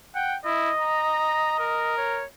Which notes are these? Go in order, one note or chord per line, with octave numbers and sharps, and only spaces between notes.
F#5 G5
E4 D#5
A#5
A#4
C#5